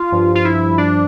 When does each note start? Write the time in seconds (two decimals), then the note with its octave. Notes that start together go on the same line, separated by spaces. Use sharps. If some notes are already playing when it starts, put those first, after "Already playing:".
Already playing: F4
0.12 G2 F3
0.35 F4
0.45 E4
0.78 D4